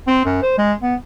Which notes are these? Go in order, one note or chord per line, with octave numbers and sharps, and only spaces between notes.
C4
F#2
C5
G#3
B3